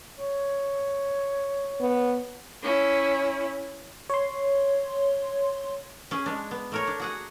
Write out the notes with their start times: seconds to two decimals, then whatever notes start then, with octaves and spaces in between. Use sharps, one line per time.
0.19 C#5
1.81 B3
2.62 C#4 E4
4.10 C#5 C6
6.11 C#4 G#4
6.26 G#3 D4
6.51 B3
6.72 A3 A#4 C#5
6.87 D4
7.00 F#4 G#4 F#5